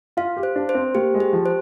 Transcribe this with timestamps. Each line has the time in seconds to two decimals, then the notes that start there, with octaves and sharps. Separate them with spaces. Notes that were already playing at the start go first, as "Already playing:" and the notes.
0.17 F4 F5
0.37 G4
0.43 C5
0.56 D4
0.69 C5
0.75 C4
0.95 A#3 G4
1.14 G#3
1.20 G4
1.33 F3
1.46 C5